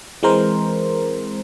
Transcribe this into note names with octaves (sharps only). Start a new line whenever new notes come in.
E3 G#3 C4 A#4 C5